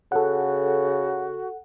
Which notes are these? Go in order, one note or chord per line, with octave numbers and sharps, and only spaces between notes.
C#3 F#4 A4 F#5